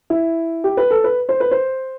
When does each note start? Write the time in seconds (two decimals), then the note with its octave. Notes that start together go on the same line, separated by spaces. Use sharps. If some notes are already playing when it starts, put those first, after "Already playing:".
0.10 E4
0.64 G4
0.77 B4
0.90 A4
1.04 B4
1.29 C5
1.40 B4
1.51 C5